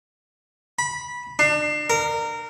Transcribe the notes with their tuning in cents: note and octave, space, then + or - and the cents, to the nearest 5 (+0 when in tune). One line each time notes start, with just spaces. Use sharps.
B5 -15
D4 +35
A#4 -20